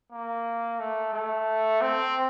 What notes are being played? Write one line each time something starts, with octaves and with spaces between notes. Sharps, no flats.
A#3
A3
A3
C4